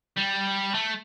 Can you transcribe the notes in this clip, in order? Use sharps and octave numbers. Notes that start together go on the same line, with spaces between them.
G3
A3